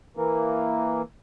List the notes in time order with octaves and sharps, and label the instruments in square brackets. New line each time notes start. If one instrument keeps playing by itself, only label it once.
[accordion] E3 A#3